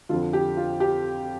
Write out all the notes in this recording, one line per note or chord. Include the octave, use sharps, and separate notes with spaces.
F2 D3 F4
G4
F4
G4